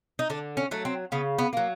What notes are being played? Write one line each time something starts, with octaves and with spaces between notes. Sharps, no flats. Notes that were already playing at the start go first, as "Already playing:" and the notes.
D#4
D3 D4
C#4
F#3 A3
C4
C#3 B3
B3
F#3 A#3